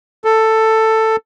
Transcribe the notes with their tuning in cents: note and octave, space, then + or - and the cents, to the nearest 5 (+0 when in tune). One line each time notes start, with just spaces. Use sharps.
A4 +10